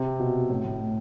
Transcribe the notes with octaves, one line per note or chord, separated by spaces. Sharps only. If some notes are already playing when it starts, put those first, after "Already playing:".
Already playing: C3
B2
A2
A2